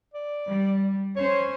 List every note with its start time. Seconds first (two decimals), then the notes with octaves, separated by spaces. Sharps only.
0.14 D5
0.46 G3
1.16 C#4 C5 C#5